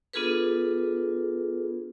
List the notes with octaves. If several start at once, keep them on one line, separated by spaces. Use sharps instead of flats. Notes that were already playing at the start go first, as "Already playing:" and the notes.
B3 D4 F4 G#4 A4 B4